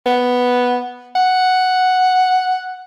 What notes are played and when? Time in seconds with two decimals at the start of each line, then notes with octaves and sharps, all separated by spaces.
0.06 B3
1.15 F#5